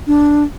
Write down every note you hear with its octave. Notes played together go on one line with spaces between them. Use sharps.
D4